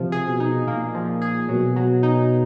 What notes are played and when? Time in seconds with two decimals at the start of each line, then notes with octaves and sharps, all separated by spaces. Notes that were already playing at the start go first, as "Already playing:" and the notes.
Already playing: C3 F3
0.12 G#4
0.27 B2
0.40 D#4
0.67 A#2 A#3
0.95 F3
1.22 G#4
1.49 B2 F#3
1.76 F#3
2.03 D#4